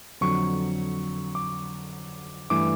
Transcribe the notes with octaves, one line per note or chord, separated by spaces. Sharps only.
F2 D3 F#3 C#6
D6
G2 E3 A3 D6